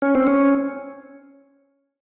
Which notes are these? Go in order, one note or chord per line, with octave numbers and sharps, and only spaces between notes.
C#4
C4
C#4